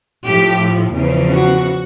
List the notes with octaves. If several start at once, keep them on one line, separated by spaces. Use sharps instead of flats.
A2 F3 G4
E2 C#3 F3
F#4